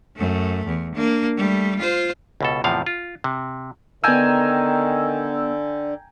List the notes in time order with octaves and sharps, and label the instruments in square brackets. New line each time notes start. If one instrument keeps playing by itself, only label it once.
[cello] F#2 A3
E2
A#3 D4
G3 A3
F4 C5
[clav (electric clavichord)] C#2 B2 A4
E2 A2 C3 F3 F5
F4
C3
[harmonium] D3 [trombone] D#3 [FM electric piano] B3 E6 [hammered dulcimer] G5 G#5 A#5